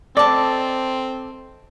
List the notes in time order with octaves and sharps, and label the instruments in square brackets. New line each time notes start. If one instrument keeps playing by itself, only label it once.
[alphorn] C4 [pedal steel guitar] A4 D6 [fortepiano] D5 [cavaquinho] D#5 A5